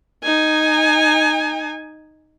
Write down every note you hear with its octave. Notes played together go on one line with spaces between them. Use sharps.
D#4 G#5